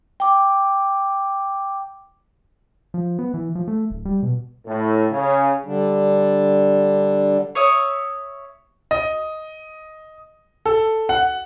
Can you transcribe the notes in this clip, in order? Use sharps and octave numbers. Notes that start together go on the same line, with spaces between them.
G5 D6
F3
B3
E3
F3
A3
D1
G3
B2
A2
C#3
D3 G3 D4
C#5 E5 D#6
D#5
A4
F#5